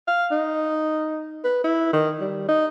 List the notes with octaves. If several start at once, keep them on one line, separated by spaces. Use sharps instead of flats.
F5
D#4
B4
E4
D#3
G3
D#4